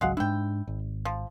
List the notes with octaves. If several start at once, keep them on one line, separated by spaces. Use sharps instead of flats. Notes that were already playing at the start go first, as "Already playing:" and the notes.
G#1 C#2 F#3 G#3 F5 F#5
G#2 G#3 D4 E4 G5
G#1
F3